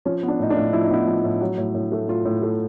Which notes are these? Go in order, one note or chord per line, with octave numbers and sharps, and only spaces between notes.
F3 C#4
B3
D4
A2 D#4
D4
A2
F3 E4
D#4
B3 E4
F3
A2
F#3
A2
A2
A3
A2 F4
A2
A3